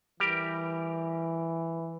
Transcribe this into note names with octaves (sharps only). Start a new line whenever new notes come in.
E3 G3 G4 A#4